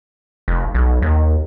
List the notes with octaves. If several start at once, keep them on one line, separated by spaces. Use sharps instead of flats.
F1
B1
D#2